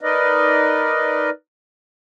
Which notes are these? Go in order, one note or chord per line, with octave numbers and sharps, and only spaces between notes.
D#4 A#4 B4 D5 D#5